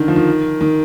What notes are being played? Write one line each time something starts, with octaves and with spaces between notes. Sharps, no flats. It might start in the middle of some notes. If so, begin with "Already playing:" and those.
Already playing: D3 D#3
F3
D#3
D#3